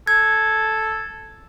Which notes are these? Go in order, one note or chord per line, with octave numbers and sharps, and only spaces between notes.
A4 G#6